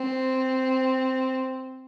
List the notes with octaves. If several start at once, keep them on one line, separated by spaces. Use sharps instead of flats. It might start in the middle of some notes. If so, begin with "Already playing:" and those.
Already playing: C4